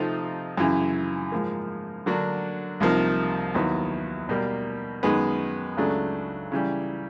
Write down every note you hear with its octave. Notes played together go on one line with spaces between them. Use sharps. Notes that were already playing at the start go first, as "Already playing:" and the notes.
Already playing: C3 F3 A3 C4 D#4
F#2 C#3 E3
G#2 F3 A#3
D3 F#3 A#3 D4 F#4
C2 C3 F3 A#3 D#4
D#2 D#3 F#3 B3 E4
B2 G3 A#3
F#2 D#3 G#3 B3
C#2 C#3 F#3 A3 D4
C#3 E3 G3